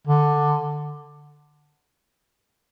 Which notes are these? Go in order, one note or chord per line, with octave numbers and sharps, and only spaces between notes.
D3